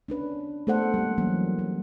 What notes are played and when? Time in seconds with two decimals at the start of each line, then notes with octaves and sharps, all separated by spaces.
0.08 C#4 D4 B4
0.67 A3 B3 A4 C5 D5 F#5
0.94 G3 A#3
1.18 E3 F#3 A#3 C#4
1.59 G3